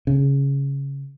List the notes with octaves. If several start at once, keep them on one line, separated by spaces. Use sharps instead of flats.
C#3